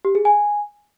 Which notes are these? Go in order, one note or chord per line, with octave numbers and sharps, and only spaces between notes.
G4
G#4
G#5